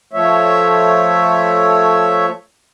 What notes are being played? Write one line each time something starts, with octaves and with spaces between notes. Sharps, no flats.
F3 A3 C#5 E5